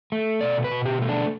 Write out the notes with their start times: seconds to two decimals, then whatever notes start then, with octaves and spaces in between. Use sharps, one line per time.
0.12 A3
0.41 B2 D5
0.64 B4
0.71 B2
0.86 G4
1.02 A3
1.09 D4